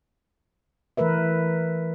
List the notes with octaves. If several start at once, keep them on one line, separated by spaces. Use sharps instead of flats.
E3 A3 A#4 B4 E5